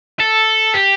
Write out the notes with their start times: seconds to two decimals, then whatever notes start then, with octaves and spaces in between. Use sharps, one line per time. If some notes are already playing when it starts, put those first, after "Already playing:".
0.20 A4
0.74 G4